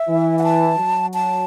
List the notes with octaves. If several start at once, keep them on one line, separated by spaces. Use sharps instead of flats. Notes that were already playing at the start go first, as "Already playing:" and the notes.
Already playing: E5
E3
F#5
A5
F#3
A5